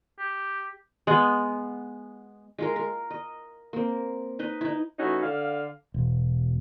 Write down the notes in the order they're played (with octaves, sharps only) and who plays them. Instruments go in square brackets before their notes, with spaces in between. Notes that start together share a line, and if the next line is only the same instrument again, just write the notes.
[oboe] G4
[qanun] G#3 B3
G#3 F4 A#4
A#4
D#5
A#3 C4
D#4 B4 D#5
D#4 E4
[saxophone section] E3 A3 C#4 D#4 F#4
D3 F5
[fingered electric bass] E1